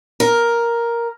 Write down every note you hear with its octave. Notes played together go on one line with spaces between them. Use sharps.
A#4